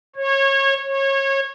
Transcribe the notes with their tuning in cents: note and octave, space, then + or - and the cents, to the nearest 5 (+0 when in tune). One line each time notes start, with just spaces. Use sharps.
C#5 -25
C#5 -25